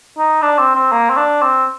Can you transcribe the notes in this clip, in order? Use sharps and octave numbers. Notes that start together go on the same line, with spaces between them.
D#4
D4
C4
C4
A#3
C4
D4
C4